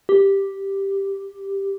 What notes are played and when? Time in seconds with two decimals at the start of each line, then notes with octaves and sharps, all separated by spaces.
0.09 G4